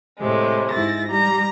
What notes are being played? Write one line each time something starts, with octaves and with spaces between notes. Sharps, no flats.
A2 C3 G#3
G#2 E4 A6 A#6
G3 A#5